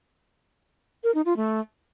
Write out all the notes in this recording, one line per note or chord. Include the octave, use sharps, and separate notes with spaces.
A#4
D#4
F4
A3